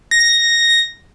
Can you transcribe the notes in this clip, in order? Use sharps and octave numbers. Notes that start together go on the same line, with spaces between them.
A#6